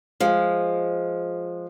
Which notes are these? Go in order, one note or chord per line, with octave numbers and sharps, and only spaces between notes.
F3 G#3